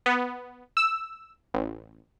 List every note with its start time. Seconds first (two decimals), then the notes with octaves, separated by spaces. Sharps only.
0.06 B3
0.77 E6
1.54 A1